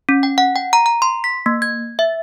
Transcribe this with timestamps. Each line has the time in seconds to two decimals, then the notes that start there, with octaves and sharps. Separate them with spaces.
0.09 C#4
0.23 G5
0.38 F#5
0.56 G5
0.73 A#5
0.86 A#5
1.02 C6
1.24 B6
1.46 A#3
1.62 G#6
1.99 E5